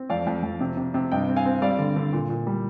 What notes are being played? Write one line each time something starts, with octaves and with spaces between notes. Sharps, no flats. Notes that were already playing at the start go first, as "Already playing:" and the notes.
Already playing: C4
F2 D5 F5
F2
F2
C3
C3
C3
G2 D#5 G5
C4
F5 G#5
C4
G3 D5 F5
D3
D3
A#2
A#2
G3